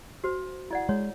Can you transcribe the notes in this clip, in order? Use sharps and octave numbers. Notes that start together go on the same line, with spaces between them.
F#4 C5
E4 D5 F#5
G#3 C#5